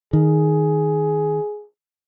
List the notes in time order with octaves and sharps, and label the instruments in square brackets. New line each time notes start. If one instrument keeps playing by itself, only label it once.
[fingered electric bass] D#3 [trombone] G#4